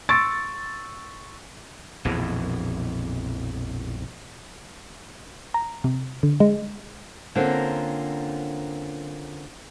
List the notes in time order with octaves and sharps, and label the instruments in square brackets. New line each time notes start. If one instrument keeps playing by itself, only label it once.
[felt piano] C6 C#6 E6 A6 D7
[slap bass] A#1 F2 B2 E3
[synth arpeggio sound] A#5
C3
D3
G#3
[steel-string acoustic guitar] D3 A#3 C4 C#4 F4 A#4